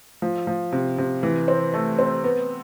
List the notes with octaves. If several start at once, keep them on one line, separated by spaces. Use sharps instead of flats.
F3
F3
C3
C3
E3
C4
A3
C4
B3